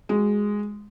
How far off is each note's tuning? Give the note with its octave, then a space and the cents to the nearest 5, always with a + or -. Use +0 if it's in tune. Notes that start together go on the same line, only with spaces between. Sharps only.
G#3 -5 F#4 -5